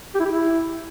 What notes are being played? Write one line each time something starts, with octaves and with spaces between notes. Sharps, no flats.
G4
E4
G4
E4